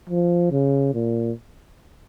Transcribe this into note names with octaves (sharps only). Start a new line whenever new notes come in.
F3
C#3
A#2